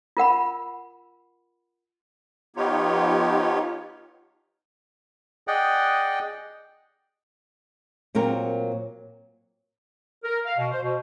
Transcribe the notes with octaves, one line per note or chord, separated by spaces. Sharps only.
F4 A#4 F#5 B5
F3 B3 D#4 F4 G4 C#5
G#4 D5 D#5 F#5 G5
A#2 F#3 C4 A#4
A#4
F5
B2
C5
B2